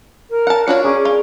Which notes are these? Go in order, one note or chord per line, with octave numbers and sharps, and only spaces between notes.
A#4
F#5 A5
D4 F4 F#4 C#5
C#4 G#4 A#4 D5
F4